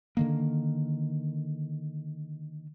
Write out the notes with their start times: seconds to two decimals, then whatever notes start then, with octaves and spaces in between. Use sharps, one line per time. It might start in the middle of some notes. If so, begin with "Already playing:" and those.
0.17 D3 D#3 A#3